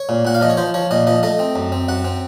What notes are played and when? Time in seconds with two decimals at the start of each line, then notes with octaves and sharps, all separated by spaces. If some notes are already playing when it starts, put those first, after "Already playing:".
Already playing: C#5
0.09 A#2
0.25 A#2 F#5
0.35 F5
0.41 F3 D#5
0.50 C#5
0.57 F3 C5
0.74 F3 C#5
0.91 A#2 D#5
1.07 F3 D#5
1.23 A3 D#5
1.39 C4
1.56 F#2
1.72 C4
1.88 F#2 F#5
2.05 C4